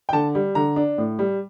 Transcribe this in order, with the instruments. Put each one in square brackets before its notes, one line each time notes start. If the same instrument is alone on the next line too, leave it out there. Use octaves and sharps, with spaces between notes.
[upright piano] G5
D3 A5
G3
D3 A#5
D4
A2
G3